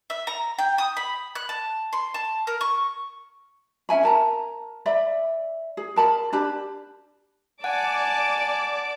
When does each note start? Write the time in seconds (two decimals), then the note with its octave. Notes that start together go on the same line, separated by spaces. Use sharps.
0.10 E5
0.27 A#5
0.59 G5
0.78 D#6
0.97 B5
1.35 F#6
1.49 A5
1.93 C6
2.14 A5
2.47 A#4
2.61 C#6
3.89 C#4 E5 G#5 B5
4.03 A#4 A5 A#5
4.86 D5 E5 B5
5.77 G#4
5.96 A#4 A5 B5
6.33 D4 G4 A5 B5
7.64 D5 F#5 G#5 A5 D6